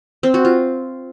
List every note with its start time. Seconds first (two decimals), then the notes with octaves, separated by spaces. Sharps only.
0.23 C4
0.34 F#4
0.45 F4